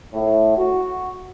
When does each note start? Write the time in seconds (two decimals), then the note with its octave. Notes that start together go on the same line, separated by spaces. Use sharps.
0.13 A2
0.58 F#4